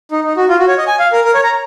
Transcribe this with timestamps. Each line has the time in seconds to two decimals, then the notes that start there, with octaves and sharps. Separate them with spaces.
0.12 D#4
0.24 D#4
0.37 F#4
0.49 F4
0.59 F#4
0.68 C#5
0.78 D#5
0.87 G#5
0.99 F5
1.12 A#4
1.24 A#4
1.34 C#5
1.43 A#5